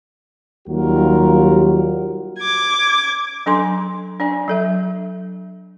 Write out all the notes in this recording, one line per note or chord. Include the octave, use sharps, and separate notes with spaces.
D#2 F#3 G3 F4 F#4 A#4
D6 G#6
F#3 D4 A4 G#5 C6
D4 D5 G#5
F#3 A4 E5